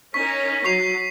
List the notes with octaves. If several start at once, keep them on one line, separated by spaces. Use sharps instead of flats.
C#4 D#4 A#4 C#6 B6
F#3 C#6 C7 F7